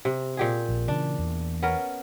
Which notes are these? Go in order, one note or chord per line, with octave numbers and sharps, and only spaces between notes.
C3
A#2 G4 G#4
A#1
C#3 E3 D4
E2
B3 C#4 A#4